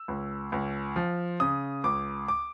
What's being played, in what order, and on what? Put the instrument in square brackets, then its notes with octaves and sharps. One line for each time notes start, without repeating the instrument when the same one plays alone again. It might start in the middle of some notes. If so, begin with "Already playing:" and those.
Already playing: [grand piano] E6
C#2
C#2
F3
C#3 D#6
C#2 D6
D6